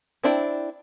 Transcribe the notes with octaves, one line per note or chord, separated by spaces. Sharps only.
C4 D4 E4 G5